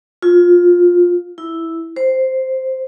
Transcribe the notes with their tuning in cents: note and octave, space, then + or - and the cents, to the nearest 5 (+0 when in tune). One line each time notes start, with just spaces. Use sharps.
F4 +15
E4 -5
C5 +0